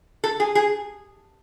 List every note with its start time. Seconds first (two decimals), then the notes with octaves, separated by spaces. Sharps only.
0.24 A4
0.40 G#4
0.55 G#4